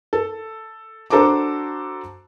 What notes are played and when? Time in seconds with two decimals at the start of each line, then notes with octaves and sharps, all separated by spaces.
0.13 A4
1.10 D4 F#4 A4 C5 A#5 D6